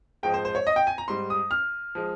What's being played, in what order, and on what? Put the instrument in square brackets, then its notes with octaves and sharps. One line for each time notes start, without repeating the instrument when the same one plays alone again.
[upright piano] G#2 F3 G#3 G5
C5
C5
C#5
D#5
G5
G#5
A#5
G#2 G3 C6
D#6
F6
F3 G#3